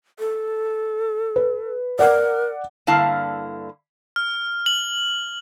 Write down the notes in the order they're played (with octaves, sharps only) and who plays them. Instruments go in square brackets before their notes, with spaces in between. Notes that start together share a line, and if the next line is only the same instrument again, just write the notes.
[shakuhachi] A4
[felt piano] B4
[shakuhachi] A#4 [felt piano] D5 F#5
[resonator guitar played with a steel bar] G2 D3 A#3 E4 F5 A5
[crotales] F6
F#7